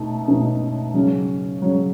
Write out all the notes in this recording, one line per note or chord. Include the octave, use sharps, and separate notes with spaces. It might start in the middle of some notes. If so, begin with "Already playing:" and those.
Already playing: B2 A3 D#4
B2 A3 D#4
C#3 F#3 C#4
C#3 F#3 C#4